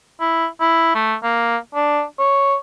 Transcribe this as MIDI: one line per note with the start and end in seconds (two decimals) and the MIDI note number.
0.21 0.46 64
0.61 0.95 64
0.95 1.15 57
1.23 1.57 58
1.75 2.03 62
2.19 2.56 73